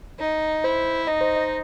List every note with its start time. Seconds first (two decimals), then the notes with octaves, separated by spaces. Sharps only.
0.19 D#4
0.64 E4 C5
1.07 D#4 D#5
1.21 C5
1.36 D#5